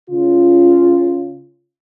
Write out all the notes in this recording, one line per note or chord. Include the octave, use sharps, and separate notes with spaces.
C#3 F4